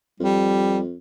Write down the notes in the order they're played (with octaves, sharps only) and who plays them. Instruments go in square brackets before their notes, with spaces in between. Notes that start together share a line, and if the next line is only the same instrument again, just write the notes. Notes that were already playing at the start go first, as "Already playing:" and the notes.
[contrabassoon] F2 [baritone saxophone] G3